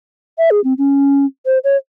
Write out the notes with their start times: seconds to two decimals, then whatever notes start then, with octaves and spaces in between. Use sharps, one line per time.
0.38 E5
0.51 G#4
0.64 C4
0.78 C#4
1.46 C5
1.64 C#5